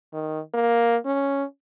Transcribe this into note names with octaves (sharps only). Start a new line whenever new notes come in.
D#3
A#3
C#4